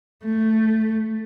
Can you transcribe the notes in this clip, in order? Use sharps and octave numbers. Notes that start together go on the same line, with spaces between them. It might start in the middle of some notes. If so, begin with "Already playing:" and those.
A3